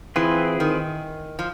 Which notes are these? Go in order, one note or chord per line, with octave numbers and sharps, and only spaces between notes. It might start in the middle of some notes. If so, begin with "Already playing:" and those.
E3 C4 F4 G#4 B4
D#3
F3